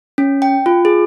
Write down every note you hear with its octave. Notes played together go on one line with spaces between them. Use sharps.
C#4
G5
F4
G#4